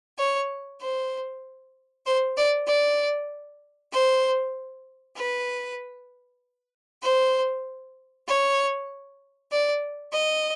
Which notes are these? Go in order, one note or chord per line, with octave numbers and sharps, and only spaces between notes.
C#5
C5
C5
D5
D5
C5
B4
C5
C#5
D5
D#5